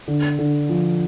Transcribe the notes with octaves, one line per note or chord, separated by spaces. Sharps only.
D3
D3
F3